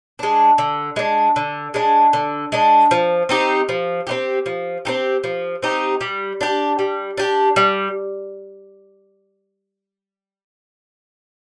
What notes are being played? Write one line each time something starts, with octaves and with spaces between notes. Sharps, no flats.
G#3 D4
D3
G#3 D4
D3
G#3 D4
D3
G#3 D4
F3
C4 D#4 G4
F3
C4 D#4 G4
F3
C4 D#4 G4
F3
C4 D#4 G4
G3
D4 G4
G3
D4 G4
G3